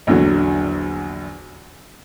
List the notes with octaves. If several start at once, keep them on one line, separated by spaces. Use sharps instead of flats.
A#1 E2 D3 F#3